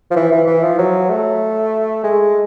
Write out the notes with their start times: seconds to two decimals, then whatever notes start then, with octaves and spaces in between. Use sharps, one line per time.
0.11 F3
0.16 E3
0.32 E3
0.47 E3
0.63 F3
0.78 F#3
1.10 A3
2.04 G#3